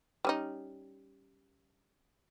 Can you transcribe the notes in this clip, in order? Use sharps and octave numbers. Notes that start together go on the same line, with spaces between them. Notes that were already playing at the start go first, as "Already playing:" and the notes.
G3 C#4 D#4